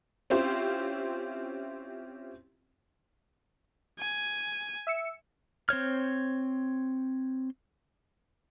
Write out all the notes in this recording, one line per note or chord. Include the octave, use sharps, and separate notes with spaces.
C4 C#4 E4 F4 G4 C5
G#5
E5 E6 C#7
C4 C5 C#5 F6